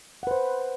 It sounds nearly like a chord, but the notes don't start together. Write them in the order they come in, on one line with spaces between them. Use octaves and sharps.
F#5 B4 C5